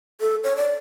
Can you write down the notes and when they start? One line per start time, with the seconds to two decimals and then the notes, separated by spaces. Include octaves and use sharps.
0.21 A4
0.44 C#5
0.57 D5